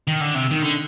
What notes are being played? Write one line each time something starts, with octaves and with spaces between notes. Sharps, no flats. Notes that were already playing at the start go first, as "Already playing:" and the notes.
D#3
D3
C3
D#3
D3